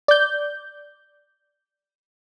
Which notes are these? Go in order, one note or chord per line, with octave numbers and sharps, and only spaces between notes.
D5 G6